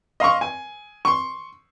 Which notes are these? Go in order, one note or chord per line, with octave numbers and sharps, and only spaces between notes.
D#5 F5 C6 C#6
G#5
C6 C#6